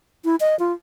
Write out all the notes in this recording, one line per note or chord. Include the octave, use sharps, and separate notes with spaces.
E4
D#5
F4